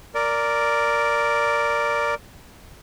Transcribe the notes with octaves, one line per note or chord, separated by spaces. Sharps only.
A#4 D5